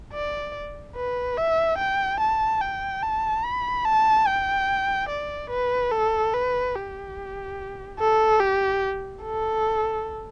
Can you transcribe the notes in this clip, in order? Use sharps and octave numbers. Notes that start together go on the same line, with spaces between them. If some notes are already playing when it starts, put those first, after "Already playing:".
D5
B4
E5
G5
A5
G5
A5
B5
A5
G5
D5
B4
A4
B4
G4
A4
G4
A4